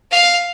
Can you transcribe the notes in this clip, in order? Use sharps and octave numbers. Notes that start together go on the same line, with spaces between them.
F5